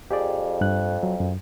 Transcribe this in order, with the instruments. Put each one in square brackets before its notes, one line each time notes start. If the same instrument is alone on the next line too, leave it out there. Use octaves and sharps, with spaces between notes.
[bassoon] F2 [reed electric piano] G4 G#4 D5
[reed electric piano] G2 F#6
F#3
F#2